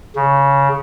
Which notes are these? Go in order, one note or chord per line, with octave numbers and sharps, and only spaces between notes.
C#3